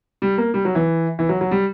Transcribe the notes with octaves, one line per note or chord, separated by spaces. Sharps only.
G3
A#3
G3
F#3
E3
E3
F#3
F#3
G3